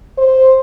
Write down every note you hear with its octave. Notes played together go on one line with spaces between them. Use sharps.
C5